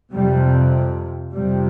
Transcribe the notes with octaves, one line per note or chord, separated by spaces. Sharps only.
F2 C3 G3
F2 C3 G3